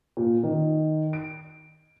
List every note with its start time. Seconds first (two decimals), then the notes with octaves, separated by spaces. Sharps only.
0.17 A#2
0.43 D#3
1.13 D7